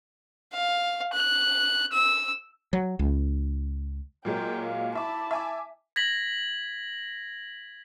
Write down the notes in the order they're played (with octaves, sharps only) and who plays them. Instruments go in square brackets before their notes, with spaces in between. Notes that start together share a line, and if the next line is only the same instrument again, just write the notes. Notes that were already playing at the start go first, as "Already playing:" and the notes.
[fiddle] F5
F#6
E6
[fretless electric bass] F#3
C#2
[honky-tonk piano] A#2 F#3 G#3 [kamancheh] A#4 G5
[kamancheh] F5
[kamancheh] E4 A5 [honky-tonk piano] E5 D6
[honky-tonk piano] E5 G#5 D6
[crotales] G#6 A#6 B6 F#7